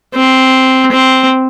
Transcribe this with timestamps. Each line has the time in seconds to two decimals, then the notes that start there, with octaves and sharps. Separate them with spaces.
0.14 C4
0.92 C4